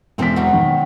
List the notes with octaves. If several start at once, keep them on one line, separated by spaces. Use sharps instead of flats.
E1 E3 C4 A#4 B6
B2 F#3
D#3